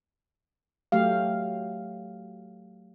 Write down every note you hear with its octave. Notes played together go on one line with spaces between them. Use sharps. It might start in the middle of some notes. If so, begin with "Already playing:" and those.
F#3 A3 G4 F5